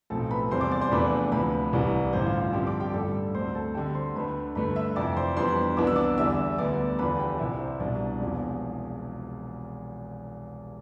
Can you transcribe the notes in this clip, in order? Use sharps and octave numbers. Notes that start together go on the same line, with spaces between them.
B1 A2 F3 C4 A4 A5
B4 B5
E2 C3 G3 C4 C5 C6
D5 D6
D5 D6
C5 C6
E2 C3 F3 A3 D4 B4 B5
D2 C3 F3 B4 B5
C2 C3 E3 G3
A1 G2 D3 C5
F4 F5
F4 F5
G2 D3 F3 C4 G4 G5
D5 D6
G4 G5
A1 G2 D3 G3 A4 A5
D2 D3 A3 C4 C5 C6
A4 A5
D2 D3 G3 C4 G4 G5
C5 C6
D2 D3 A3 D4 B4 B5
G2 D3 A3 D4 B4 B5
E5 E6
F2 C3 E3 D5 D6
C5 C6
F2 E3 G3 B3 D4 C5 C6
C2 C3 E3 B3 D4 D6
E6
D5 D6
E2 D3 G3 E5 E6
D2 D3 G3 B3 D5 D6
E2 D3 F3 B4 B5
G4 G5
C2 C3 G3 E4 E5
C5
C2 B2 G3 D4 D5
E1 E2 C3 F3